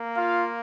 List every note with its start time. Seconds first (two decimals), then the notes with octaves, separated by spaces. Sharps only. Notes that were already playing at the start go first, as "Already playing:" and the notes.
Already playing: A#3
0.16 F4 F5